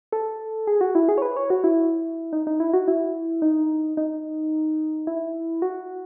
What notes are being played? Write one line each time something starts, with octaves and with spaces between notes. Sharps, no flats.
A4
G#4
F#4
E4
G#4
C#5
B4
C#5
F#4
E4
D#4
D#4
E4
F#4
E4
D#4
D#4
E4
F#4